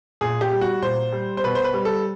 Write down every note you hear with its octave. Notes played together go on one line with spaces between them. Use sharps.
A#2 G#4
G4
G3
F#4
A#2 C5
G3
C5
B2 B4
C5
B4
G3
A4